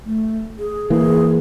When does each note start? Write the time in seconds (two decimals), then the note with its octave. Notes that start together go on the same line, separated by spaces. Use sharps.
0.05 A3
0.59 G#4
0.90 E3 A#3 G#4